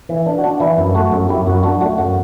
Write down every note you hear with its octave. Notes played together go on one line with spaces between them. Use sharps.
E3
D4
F#4
D4
E3 E4
F#2
A3 F#4
F#2
F#2 E4 G4
F#2 F#4
D4 F#4
A3 F#4
F#2 F#4